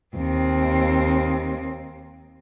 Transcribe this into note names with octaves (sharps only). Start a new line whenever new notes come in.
D#2 C4